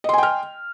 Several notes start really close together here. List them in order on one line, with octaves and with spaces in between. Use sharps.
D#5 C6 G#5 G5 F6